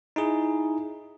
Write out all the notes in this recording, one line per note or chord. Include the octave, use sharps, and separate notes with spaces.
D#4 E4 G#4